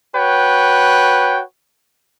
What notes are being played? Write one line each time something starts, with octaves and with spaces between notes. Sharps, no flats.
F#4 B4 C#5 G5